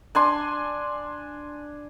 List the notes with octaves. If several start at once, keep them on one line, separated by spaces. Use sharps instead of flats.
D4 G#5 C6